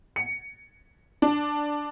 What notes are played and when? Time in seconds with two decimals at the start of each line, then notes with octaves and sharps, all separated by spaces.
0.16 C#7
1.22 D4